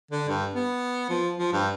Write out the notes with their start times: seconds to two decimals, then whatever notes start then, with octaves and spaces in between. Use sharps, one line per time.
0.11 D3
0.28 G2
0.54 B3
1.09 F3
1.38 F3
1.53 G2